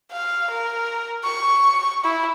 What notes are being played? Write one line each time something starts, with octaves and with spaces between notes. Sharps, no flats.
F5
A#4
C#6
E4